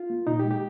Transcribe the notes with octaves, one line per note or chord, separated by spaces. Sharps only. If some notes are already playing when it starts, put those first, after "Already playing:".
Already playing: F4
A#3
A#2 D#4
G4
G#3
G4